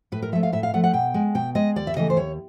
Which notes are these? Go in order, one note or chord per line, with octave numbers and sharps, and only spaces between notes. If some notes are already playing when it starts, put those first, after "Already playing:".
A2 B4
A#4
F3 A3 E5
F5
A2 E5
F5
F3 A3 F#5
F#5
B2 G5
G#3
B2 G5
G#3 D#5
D#2 D5
E5
C#3 E3 A3 D#5
C5
D#2 C#5